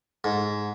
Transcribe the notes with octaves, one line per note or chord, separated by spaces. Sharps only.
G#2